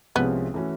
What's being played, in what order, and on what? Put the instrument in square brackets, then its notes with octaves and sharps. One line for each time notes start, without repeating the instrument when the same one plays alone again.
[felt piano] C2 C3 F3 G#3 C#4 [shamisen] B3
[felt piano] E3 A3 C#4 F#4